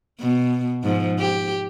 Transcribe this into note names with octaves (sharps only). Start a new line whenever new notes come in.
B2
G#2 F3
G4